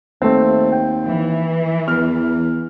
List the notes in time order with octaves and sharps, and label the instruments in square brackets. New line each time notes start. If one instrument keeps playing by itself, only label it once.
[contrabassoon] D#2 [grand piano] A3 C4
[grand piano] G5
[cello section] E3
[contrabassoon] E2 [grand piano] F6